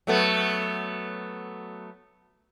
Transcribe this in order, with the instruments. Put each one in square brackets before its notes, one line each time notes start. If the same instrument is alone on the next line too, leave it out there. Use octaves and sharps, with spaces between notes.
[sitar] F#3 A3 B3